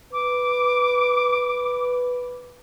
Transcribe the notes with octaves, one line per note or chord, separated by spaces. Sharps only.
B4 D6